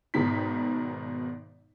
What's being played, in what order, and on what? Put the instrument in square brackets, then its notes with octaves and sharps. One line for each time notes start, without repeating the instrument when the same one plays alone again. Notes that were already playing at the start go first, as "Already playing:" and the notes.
[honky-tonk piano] G#1 G#2 B2 D#3 B6